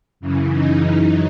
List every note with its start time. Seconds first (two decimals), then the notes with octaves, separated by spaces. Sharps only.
0.20 F#2 C#3 E3
0.52 D#4